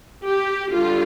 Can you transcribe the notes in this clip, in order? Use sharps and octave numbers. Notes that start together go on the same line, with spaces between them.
G4
D3 G3 F4